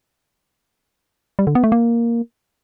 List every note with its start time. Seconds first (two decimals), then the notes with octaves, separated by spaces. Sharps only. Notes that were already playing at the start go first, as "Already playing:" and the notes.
1.39 G3
1.47 D3
1.55 B3
1.64 A3
1.72 A#3